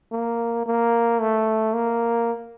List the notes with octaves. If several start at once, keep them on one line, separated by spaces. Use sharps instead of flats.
A#3
A#3
A3
A#3